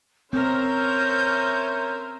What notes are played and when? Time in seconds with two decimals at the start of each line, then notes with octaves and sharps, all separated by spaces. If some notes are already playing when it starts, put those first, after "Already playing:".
0.33 C4 C#4 A#4 C5 E5 G6